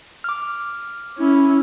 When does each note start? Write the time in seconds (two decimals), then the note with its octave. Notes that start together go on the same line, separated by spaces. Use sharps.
0.24 D6 F6
1.18 C#4 E4